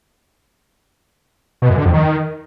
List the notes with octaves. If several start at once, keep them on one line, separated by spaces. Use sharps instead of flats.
B2
F#2
D3
F2
D#3